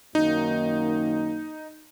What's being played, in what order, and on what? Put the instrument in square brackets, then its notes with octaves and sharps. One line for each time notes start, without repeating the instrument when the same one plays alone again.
[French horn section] F#2 D#3 A#3 [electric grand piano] D#4